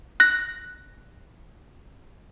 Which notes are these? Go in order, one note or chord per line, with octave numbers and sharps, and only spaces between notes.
F#6 A#6